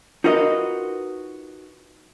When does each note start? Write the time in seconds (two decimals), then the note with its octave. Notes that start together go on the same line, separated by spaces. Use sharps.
0.24 D#4 F4 F#4 A#4 B4 D#5